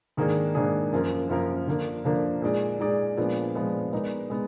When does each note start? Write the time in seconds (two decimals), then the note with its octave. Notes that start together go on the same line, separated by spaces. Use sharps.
0.17 G#2 D#3 A#3 D4 G#4
0.55 G#2 D#3 A#3 D4 G#4
0.92 F#2 F3 A#3 F4 A#4
1.29 F#2 F3 A#3 F4 A#4
1.67 D3 F3 A#3 D4
2.05 D3 F3 A#3 D4
2.42 A#2 G#3 D#4 G#4 D5
2.79 A#2 G#3 D#4 G#4 D5
3.17 A#2 F3 G#3 B3 D4
3.55 A#2 F3 G#3 B3 D4
3.92 G#3 B3 D#4 A#4 D5
4.30 G#3 B3